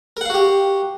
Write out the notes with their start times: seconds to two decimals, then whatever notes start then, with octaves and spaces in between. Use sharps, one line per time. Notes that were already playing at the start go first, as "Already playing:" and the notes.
0.17 A#4
0.21 F#5
0.25 F5
0.30 F#4
0.34 G4